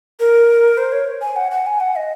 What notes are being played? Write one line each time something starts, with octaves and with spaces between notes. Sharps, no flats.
A#4
C5
C#5
G#5
F#5
F#5
G#5
F#5
D#5